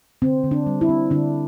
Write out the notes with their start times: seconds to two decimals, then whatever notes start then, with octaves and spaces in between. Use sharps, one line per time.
0.22 D3 C4
0.44 D3
0.51 D4
0.66 G3
0.81 E4
0.89 C4
1.10 D3 D4